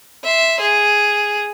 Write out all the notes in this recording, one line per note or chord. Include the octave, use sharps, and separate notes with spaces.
E5 C6
G#4